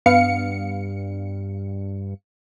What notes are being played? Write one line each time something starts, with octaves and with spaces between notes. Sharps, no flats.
G2 B3 F5 C#7